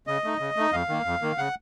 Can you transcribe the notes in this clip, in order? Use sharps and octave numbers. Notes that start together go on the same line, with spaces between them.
C#3 D#5
A3 D#4
C#3
A3 D#4
F2 F5
D#3 A#3
F2
D#3 A#3
C#3 F#5